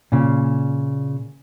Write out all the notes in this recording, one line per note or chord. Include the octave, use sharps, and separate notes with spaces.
A#2 C#3